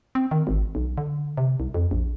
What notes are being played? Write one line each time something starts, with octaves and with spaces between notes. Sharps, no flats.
C4
D#3
G#1
B1
D3
C3
C2
F2
A#1